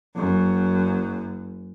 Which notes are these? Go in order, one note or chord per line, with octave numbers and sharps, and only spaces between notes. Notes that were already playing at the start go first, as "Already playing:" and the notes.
F#1 F#2